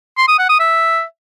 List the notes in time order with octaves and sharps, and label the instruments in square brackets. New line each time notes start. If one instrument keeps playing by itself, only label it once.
[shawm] C6
D#6
F#5
D#6
E5